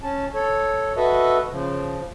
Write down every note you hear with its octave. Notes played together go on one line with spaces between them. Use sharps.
C#4 A5
A4 C#5
F#4 A4 B4 D#5 E5
C#3 F3